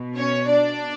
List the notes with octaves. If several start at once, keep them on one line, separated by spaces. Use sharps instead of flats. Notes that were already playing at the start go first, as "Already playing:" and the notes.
Already playing: B2
C#4 C#5
D4 D5